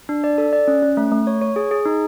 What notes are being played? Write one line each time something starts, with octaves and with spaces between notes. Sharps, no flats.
D4
D5
A4
D5
C#4
C#4
A3
A3
C#5
C#5
G#4
G#4
D#4